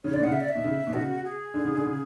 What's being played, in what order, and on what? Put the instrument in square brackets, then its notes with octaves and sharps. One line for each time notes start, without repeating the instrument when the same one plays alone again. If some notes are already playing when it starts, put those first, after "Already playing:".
[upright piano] C#3 [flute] C#5
[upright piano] D3 [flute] D5
[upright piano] B2
[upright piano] C#3 [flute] F#5
[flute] E5
D5
E5
[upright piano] B2
C#3
B2
[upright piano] C#3 [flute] F#4
[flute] G#4
[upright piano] D3
C#3
D3
C#3